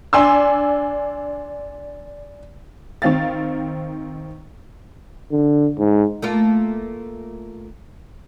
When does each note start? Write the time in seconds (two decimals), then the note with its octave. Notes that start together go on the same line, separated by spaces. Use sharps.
0.13 D4 G#5 C6 E6
3.02 D#3 C4 F5 A6
5.32 D3
5.78 G#2
6.22 A3 A#3 F4